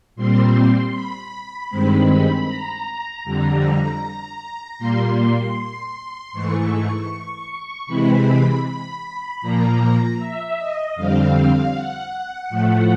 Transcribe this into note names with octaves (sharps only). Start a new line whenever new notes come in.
A#2 G3 C4 C6
B5
G2 D#3 G#3 C4
A#5
F2 D3 G3 A#5
A#2 G3 A#3 C6
G#2 E3 A3 C#6
C3 E3 G#3 C4 B5
B5
A#2 F3 A#3 A#5
E5
D#5
F2 D3 G3 C4 F5
F#5
A2 F3 A3